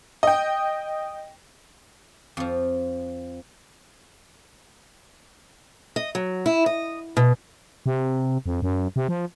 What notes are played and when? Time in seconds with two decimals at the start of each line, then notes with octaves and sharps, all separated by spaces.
0.23 D#5 G5
2.37 F2 F3
5.96 D#5
6.15 F#3
6.46 E4
6.66 D#5
7.17 B2
7.86 C3
8.46 F2
8.62 F#2
8.96 C3
9.08 F3